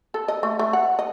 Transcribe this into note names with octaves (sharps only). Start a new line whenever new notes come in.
A4
D#5
A3
A3
F#5
D#5